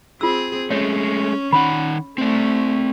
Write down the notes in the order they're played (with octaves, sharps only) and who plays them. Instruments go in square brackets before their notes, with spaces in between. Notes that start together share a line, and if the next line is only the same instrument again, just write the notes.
[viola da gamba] C4 G#4 [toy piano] F4 E6
[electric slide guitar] G#3 A3 [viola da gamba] C#4 [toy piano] C#5
[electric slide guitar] D#3 D#4 F#5 [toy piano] B5
[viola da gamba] A3 [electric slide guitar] C4 D5